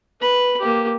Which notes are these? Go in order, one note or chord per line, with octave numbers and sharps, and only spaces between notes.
B4 B5
A#3 G4